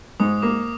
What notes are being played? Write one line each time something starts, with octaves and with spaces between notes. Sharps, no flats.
G#2 D#6
A#3 D6